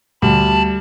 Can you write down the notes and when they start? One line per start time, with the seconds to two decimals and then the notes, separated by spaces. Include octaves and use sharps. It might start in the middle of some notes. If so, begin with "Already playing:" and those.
0.22 D2 G3 A5 B5